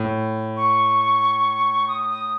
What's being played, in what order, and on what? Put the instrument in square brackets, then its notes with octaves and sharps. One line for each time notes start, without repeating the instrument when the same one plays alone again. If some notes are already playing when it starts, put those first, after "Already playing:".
Already playing: [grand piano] A2
[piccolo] C#6
D#6
D#6